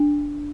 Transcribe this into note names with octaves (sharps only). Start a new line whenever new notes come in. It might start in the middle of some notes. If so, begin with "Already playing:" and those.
Already playing: D4